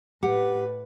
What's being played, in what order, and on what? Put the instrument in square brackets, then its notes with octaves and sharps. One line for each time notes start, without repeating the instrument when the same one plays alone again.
[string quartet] A2 B4 [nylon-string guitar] G4 F#5